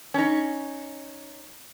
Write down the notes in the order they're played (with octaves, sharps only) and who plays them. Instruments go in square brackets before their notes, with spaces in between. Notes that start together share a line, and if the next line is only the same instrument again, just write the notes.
[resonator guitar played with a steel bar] C#4 D#4